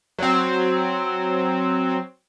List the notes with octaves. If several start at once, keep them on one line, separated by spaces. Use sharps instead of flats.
F#3 C4